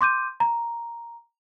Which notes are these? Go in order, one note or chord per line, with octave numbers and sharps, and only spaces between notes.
C6 D6 G6 D#7
A#5